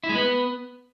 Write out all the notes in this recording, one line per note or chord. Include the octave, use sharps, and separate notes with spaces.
E4
G#3
B3